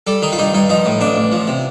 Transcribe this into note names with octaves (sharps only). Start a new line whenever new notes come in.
G3 A4
D#3 D#4
F4
G2 D#4
G2 D#4
F3 D#4
A2
A1 D4
A1
F3
C3